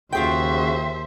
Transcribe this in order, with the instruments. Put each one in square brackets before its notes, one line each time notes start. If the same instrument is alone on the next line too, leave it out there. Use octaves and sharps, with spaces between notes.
[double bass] D#2 [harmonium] C#3 F#4 [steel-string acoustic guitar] F4 G#4 G5 [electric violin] C5 E5